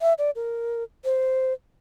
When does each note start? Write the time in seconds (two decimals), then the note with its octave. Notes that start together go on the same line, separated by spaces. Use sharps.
0.01 E5
0.18 D5
0.36 A#4
1.05 C5